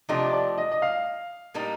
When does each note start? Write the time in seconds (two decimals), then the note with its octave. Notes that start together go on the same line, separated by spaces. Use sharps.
0.09 C3 F3 A3 D4 G4 D#5
0.33 D5
0.58 D#5
0.72 D#5
0.82 F5
1.54 A2 G3 A#3 D#4